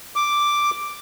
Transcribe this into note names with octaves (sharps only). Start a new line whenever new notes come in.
D6